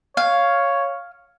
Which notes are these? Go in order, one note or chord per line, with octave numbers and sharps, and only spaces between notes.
C#5 F5